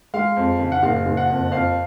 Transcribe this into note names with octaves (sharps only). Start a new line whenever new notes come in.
G#3 F5
F2
C#3
F#5
F#1 F5
F#1
F#5
F2
F2 F5